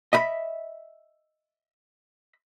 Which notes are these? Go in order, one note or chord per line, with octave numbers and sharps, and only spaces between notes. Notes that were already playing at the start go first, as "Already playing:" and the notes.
D#5 E5 B5